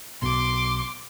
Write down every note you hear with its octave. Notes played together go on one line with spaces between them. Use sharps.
B1 B2 C6 D6